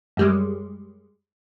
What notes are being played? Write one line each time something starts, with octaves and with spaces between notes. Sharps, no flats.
F#2 G3 G#3